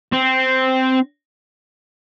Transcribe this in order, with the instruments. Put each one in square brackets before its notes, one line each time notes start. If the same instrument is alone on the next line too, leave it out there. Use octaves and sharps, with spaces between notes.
[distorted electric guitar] C4